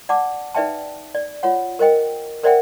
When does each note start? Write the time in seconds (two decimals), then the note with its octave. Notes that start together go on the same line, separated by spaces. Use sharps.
0.09 D5 F#5 A5 D6
0.54 D#4 B4 D5 E5 G5 A5
1.15 D5
1.43 F4 C#5 F#5
1.79 A#4 C5 D#5 G5
2.43 A#4 C5 D5 E5 F#5 G5